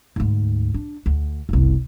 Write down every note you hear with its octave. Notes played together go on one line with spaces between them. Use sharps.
D2 G#2
D4
D2
F#1 C2